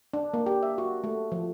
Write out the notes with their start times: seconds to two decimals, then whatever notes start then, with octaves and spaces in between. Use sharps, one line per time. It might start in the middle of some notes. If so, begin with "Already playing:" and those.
0.13 D4
0.34 A#3
0.46 G4
0.63 E5
0.78 F#4
1.04 A3
1.32 F3